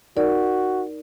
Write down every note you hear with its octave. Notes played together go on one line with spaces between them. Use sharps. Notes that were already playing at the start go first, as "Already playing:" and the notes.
D#4 F#4 A#4 D5